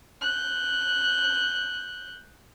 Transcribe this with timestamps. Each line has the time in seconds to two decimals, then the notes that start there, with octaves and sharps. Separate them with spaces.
0.21 F#6 G6